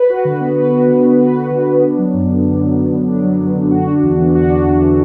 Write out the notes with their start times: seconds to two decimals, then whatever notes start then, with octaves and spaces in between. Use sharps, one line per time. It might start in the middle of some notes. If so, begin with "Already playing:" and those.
Already playing: B4
0.10 F#4
0.25 D3
0.41 B3
0.56 B4
0.71 F#4
0.88 D3
1.04 B3
1.19 B4
1.35 F#4
1.51 D3
1.66 B3
1.83 D4
1.98 F#3
2.14 F#2
2.29 D3
2.46 D4
2.61 F#3
2.77 F#2
2.92 D3
3.08 D4
3.24 F#3
3.40 F#2
3.55 D3
3.71 F#4
3.87 D4
4.03 E2
4.18 E3
4.35 F#4
4.50 D4
4.66 E2
4.82 E3